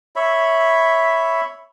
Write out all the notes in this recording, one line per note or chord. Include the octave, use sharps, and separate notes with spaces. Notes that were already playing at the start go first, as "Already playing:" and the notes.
C#5 E5 B5